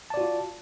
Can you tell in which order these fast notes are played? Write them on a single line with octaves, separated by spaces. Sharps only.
A5 D5 F#4 F4